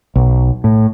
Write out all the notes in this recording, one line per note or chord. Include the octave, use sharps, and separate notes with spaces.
B1
A2